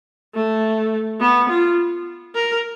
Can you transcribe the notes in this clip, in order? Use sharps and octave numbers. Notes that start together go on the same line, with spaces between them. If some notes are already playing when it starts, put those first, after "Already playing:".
A3
B3
F4
A#4